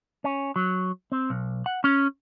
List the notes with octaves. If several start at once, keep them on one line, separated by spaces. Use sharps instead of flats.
C#4
F#3
C4
B1
F#5
C#4